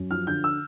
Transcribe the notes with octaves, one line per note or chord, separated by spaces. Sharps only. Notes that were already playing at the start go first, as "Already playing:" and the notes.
Already playing: F#2
F3 F6
D3 G6
E6